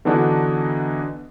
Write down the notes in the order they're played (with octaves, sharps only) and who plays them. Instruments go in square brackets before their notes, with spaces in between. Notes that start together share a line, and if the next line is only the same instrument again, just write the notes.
[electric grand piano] D3 E3 B3 D4 D#4 F#4